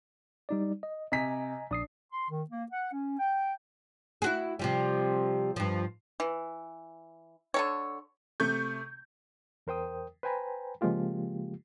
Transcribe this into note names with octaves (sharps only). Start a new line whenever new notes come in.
G3 D#4 D5
D#5
C3 D#5 G#5 A#5 B6
A#1 D4 D#6 C7
C6
D#3
A#3
F#5
C#4
G5
E4 F#4 G#4
C3 F3 G3
G2 F3
E3
D3 A4 C#5
C3 A3 C#6 G6
E2 A#4 C5 G5 D#6
B4 C5 G5 G#5 A#5 B5
C#3 F3 G#3 A#3 F4 G4